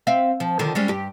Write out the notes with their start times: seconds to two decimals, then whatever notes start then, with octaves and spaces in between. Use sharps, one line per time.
0.07 C4 E5 F5
0.40 F3
0.59 D3 D#3 F3
0.75 G3 G#3 C#4
0.88 G2 G4